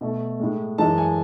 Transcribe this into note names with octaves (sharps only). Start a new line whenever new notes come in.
B2 A3
A2 G#3
F#2 E3 G#3 A5
G#5